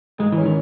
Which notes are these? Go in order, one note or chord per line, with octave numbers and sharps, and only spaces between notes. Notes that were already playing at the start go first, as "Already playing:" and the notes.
G#2 G#3
E3
C#4
D#3